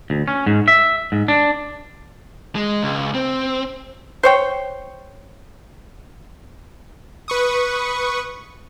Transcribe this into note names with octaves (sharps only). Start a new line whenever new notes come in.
D2
C#4
G#2
E5
G#2
D4
G#3
C#2
C4
C5 C#5 G5
B4 C#6 D#6